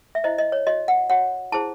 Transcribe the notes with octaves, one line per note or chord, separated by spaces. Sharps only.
E5
E4 C5 D#5
D#5
C#5
F#4 C#5 D#5
F#5
F#4 C#5 F#5
E4 G#4 C5 A5